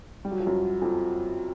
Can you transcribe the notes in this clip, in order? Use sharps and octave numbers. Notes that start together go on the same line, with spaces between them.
G3
F#3
F3
F#2 F#3
F2 F3